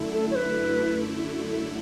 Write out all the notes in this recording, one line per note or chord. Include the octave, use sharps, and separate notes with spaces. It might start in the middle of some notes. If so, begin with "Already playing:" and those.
Already playing: F#2 D3 A3 E4
A4
C#5
B4